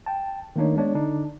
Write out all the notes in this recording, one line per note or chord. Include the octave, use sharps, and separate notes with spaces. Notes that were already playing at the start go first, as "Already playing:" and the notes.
G5 A5
D#3 A3 A#3 D4 D#4 C#5
G#3 B3 D4 C#5 D5
D3 D4 D#4